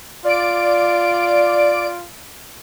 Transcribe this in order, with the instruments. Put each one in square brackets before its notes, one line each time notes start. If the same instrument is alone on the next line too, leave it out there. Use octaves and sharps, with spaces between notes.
[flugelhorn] F4 [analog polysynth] D5 D7